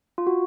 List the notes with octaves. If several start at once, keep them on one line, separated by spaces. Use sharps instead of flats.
F4
F#4